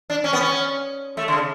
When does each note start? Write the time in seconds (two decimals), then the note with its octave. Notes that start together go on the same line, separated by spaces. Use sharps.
0.10 D4
0.24 C#4
0.33 B3
0.40 C#4
1.17 A3
1.28 D3
1.32 C#3